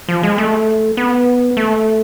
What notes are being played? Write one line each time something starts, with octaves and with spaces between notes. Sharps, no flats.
F3
G#3
A3
B3
A3